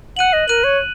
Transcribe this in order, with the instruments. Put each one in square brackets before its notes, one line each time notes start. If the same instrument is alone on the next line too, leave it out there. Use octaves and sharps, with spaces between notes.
[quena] F#5 [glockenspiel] F#6 D#7 F#7
[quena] D#5
[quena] A#4 [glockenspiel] F#6 D#7 F#7
[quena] C#5